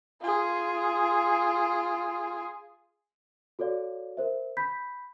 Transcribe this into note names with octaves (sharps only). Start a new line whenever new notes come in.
F4 G#4
F#4 A4 C#5 D5 F5
A#4 C5 E5
B5 G6 B6